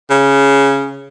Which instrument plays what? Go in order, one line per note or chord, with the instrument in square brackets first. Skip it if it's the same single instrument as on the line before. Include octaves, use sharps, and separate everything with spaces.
[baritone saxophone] C#3